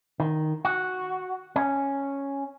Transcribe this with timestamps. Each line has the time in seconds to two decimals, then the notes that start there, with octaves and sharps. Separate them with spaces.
0.20 D#3
0.65 F#4
1.56 C#4